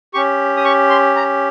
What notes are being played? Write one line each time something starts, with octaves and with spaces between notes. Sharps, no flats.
C#4 G4 C#6
D#6
C#6
C6
A#5